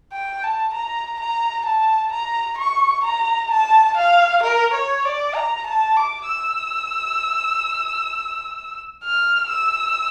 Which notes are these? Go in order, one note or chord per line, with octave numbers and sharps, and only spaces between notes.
G5
A5
A#5
A#5
A5
A#5
C#6
A#5
A5
F5
A#4
C#5
D5
A#5
A5
D6
E6
F6
E6